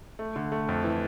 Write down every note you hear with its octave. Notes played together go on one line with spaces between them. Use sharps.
A3
D3
A3
F2
E3